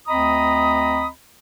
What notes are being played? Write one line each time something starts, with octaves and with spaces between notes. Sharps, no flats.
D2 C4 D#5 A#5 B5 D#6